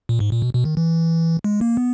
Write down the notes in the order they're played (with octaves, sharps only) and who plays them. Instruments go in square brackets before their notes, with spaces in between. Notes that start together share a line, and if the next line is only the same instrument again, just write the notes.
[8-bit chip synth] A#2
G#2
A#2
B2
B2
D#3
E3
G#3
A#3
B3